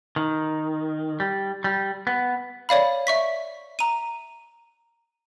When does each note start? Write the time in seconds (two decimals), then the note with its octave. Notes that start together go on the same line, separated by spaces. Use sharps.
0.16 D#3
1.20 G3
1.64 G3
2.07 B3
2.69 C#5 D5 F5 B5
3.07 E5 C#6 B6
3.79 A#5 D#7